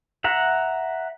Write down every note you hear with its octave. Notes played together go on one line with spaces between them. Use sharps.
E5 F#5 A#5